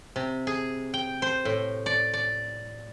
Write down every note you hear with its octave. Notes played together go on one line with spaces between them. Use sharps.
C3
G#4
G5
C5
A2
D5
D5